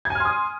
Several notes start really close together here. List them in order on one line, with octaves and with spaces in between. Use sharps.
G#6 G#5 F6 C6 D#6